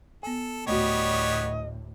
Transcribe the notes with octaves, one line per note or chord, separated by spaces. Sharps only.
B3 A4 G#5
D2 A2 G3 A3 B3 F#4 C#5 D#5